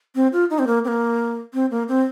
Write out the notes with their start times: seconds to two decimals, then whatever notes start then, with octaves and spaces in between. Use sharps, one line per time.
0.15 C4
0.33 F4
0.50 D#4
0.59 C4
0.67 A#3
0.84 C4
0.88 A#3
1.54 C4
1.71 A#3
1.88 C4